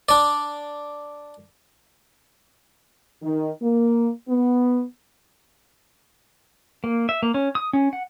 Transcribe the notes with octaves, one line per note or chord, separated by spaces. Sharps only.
D4 D5
D#3
A#3
B3
A#3
E5
A#3
C#4
D#6
C#4
F#5